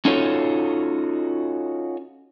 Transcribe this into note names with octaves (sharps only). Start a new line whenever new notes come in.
C#4 D#4 F4 F#4 A4 C#5